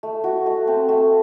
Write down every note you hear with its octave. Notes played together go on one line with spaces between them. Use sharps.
A3
F#4
A3
C4
A3